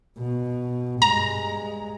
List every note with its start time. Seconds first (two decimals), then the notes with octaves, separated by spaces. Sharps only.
0.18 B2
1.02 G2 G#3 A#5